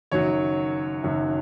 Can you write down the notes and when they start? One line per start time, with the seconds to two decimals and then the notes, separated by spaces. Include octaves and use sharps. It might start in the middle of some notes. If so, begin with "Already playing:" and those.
0.11 F#1 F#2 D#3 F#3 C#5
1.03 F#1 F#2 D#3 F#3